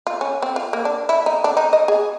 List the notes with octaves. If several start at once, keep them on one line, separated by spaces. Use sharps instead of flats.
F4
C#4
C4
F4
A#3
D4
E4
D#4
D4
D#4
D#5
G#4